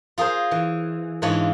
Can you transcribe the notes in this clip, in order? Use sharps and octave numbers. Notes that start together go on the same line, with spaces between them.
F4 G#4 A#4 C5
E3
G#2 E3 D4 F4 C#5 G#5